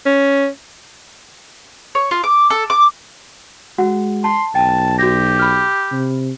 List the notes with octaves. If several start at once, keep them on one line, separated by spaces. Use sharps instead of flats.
C#4
C#5
F4
D6
A4
D6
G#3 F#4 F#5
A5 C6
B1 G5 A5
F#4 G4 G6 A#6
B5 F6
C3